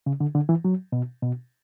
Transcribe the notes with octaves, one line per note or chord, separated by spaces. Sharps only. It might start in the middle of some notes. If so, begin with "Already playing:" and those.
C#3
D3
D3
E3
F#3
B2
B2